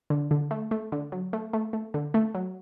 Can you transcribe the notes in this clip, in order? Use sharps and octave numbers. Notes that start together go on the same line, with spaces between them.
D3
D3
A3
A3
D3
F#3
A3
A3
A3
D3
A3
F#3